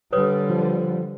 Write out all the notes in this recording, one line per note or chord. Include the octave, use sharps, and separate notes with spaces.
D3 G3 B4 C#5 D#6
F3